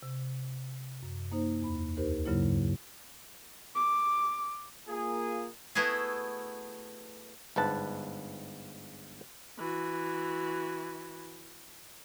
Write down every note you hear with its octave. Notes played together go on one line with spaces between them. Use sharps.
C3
F#2
A#3 D#4 C5
E2 B5
D2 D#4 G4 A#4 C5
G2 C#3 F#3 A#3 E4
D6
A#3 F4 G#4
A3 B3 E4 F#4 G#4
G1 G#2 B4 A5
E3 F#4